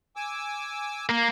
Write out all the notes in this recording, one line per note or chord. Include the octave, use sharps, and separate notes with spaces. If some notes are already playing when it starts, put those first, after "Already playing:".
G#5 D6 E6
A#3